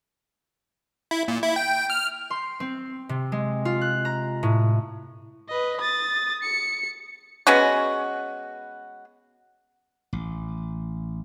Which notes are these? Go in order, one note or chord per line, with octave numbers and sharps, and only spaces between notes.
E4
A#2
E4
G5
F6
C6
C4
C3
G#3
F4
F#6
A#5
A2
B4 D#5
D#6 A6
C#7
G#3 B3 C#4 F#4
A1